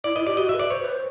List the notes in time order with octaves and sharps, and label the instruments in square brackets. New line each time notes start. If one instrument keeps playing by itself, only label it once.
[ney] E4 [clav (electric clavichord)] D5
[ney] E4 [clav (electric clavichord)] D#5
[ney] G4 [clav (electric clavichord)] D5
[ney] F#4 [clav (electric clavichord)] D#5
[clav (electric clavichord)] E5
[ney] B4
[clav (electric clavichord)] D5
[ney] C5 [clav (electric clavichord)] C#5
[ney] B4
C5